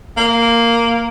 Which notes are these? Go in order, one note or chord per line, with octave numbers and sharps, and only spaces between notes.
A#3